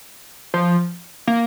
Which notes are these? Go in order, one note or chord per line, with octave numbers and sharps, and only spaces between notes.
F3
A#3